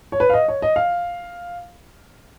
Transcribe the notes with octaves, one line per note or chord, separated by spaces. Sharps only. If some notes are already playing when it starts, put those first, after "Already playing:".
C#5
B4
F5
D#5
C#5
D#5
F5